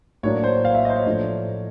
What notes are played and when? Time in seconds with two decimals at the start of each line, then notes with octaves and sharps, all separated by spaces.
0.23 A2 F#3 A#3 D4 C#5
0.44 C5
0.65 F5
0.75 E5
0.85 D#5
0.90 C5
0.96 C#5
1.06 A2 F3 A3 D4